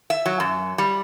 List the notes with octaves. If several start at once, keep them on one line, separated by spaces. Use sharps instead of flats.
E5
F#3
F#2
G3